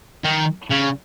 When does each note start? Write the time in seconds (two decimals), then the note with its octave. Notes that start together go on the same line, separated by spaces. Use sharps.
0.24 D#3
0.70 C#3